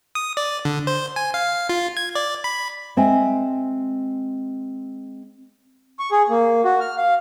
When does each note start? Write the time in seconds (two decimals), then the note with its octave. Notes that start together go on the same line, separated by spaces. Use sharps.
0.15 D#6
0.37 D5
0.65 D3
0.87 C5
1.16 G#5
1.34 F5
1.69 F4
1.97 G#6
2.15 D5
2.44 B5
2.97 G#3 C4 E5 G#5
5.99 C#6
6.12 G#4
6.29 A#3
6.65 F#4
6.81 F6
6.97 F5